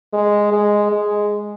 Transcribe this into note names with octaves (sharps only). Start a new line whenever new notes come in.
G#3
G#3
G#3